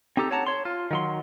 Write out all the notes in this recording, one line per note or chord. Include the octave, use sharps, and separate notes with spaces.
C4 D#4 G4 A4 A#5
C#5 F#5 A5 A#5
C#5 C6
F4
D#3 F#3 C6